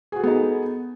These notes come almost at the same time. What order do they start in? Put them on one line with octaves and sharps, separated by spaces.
G#4 F#4 A4 B3 D#4